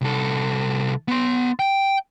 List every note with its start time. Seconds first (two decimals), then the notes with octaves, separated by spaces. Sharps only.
0.01 C2 A4
1.08 B3 C6
1.59 G5